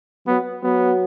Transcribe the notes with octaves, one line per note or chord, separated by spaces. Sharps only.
F#3 B3
F#3 B3